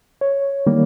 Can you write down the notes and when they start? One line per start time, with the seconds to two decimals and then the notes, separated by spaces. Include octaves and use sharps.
0.21 C#5
0.67 D#3 G3 A#3